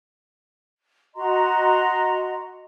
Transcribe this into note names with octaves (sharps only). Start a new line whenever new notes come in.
F#4 D#5 A#5 C6